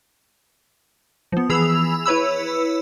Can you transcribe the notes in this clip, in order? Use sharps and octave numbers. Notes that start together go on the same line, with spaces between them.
F3 B3
E3 G#4 B5 E6 F7
E4 B4 C#5 B5 E6